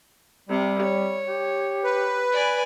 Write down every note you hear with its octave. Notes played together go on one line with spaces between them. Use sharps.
C3 G3
C#5
G4
B4
D5 G#5